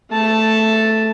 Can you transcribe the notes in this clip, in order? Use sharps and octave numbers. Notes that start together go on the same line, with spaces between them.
A3 A5